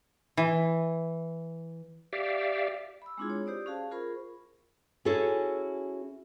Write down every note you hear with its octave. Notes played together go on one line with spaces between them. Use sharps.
E3
G4 D5 E5 F5
B5 E6
G#3 C4 D4 E4 F4 G#4
C#5
G4 C5 D5 D#6
C#4 F#4 G#4 F5 A5
F4 G#4 A#4 C5 B5 C#6
C#4 E4 F#4 G#4 A4 C#5